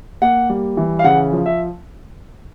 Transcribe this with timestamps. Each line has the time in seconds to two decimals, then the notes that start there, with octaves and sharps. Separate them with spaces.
0.22 A#3 F#5
0.49 G3
0.77 E3
0.99 F5
1.04 C#3 F#5
1.32 F3
1.46 E5